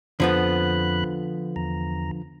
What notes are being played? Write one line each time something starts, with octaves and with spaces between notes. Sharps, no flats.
F2 D3 F3 B3 B5 F#6
E2 A#5